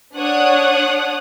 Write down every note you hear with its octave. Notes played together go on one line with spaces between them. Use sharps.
D4 C#5 F#5 D#6 F#6